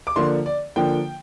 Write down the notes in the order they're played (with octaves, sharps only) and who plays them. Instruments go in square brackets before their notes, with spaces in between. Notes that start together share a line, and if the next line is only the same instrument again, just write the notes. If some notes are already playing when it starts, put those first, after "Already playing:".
[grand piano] D6
D3 F3 A#3 D4 C6
D5
D3 F3 A#3 D4 G5